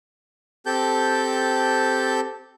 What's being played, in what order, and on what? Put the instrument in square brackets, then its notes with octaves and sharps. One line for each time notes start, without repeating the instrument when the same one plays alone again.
[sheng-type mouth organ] C4 G4 A4 A5 G6